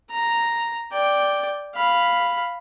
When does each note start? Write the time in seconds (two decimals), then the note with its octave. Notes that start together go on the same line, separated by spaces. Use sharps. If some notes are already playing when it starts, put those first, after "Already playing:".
0.11 A#5
0.92 D5 G5
1.75 F5 B5